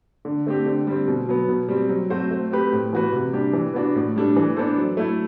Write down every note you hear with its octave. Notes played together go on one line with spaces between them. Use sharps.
D3
A3 C4 G4
D3
G3 C4
B2
F#3 B3
B2
G3 C4
F#3
A3 C4 F#4 C5
A3
C4 G4 B4
A2
E3 B3 F#4 B4
C3
G3 D4 G4
E3
B3 D4 F#4
A2
G3 D4 A4
E3
B3 D4 A4 C5
F#3
A3 E4 A4